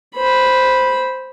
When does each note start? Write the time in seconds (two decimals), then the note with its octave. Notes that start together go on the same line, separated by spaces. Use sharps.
0.15 C5 B5